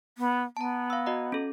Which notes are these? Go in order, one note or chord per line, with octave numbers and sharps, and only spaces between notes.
B3
B3 A5 A#5
F5 E6
F#4 D#5 A#5
C#4 A4